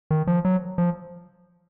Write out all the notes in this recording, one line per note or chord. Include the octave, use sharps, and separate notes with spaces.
D#3
F3
F#3
F3